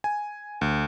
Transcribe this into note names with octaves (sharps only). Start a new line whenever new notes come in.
G#5
D2